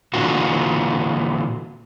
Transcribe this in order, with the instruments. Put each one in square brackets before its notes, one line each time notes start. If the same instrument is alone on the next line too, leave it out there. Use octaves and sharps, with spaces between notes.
[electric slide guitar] A#2 D3 E3 F4 F#4